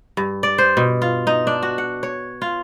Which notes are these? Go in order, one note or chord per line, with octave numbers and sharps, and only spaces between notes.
G2
D5
C5
B2
F4
D#4
D4
F#4
F#5
C#5
F4